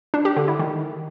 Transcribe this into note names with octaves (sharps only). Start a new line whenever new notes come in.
D4
G4
D3
E4
D#3